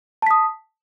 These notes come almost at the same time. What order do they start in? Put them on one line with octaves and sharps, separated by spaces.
A5 B6 D#6